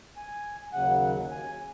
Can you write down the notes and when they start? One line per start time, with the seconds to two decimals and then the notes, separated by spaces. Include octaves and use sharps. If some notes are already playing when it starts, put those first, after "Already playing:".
0.16 G#5
0.73 D#2 C#3 F#3 F#5
1.31 G#5